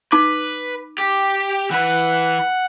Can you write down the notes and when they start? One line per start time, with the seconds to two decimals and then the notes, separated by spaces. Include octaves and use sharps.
0.12 D#4 B4 D6
0.98 G4
1.71 E3 B4 F#5